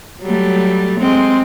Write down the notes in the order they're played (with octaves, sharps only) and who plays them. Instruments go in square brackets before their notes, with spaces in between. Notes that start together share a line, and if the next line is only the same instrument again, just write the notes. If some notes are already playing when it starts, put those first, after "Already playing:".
[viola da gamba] F#3 G3 A3
G#3 C4